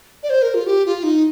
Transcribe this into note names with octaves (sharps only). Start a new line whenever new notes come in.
D5
C5
A#4
F4
G4
F4
D#4